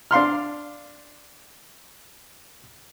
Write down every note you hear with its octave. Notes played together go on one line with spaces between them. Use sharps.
D4 F5 C6 F6